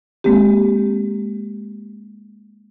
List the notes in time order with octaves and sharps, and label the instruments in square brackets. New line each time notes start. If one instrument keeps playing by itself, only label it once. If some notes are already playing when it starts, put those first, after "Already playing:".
[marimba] G#3 A#3 C4 G4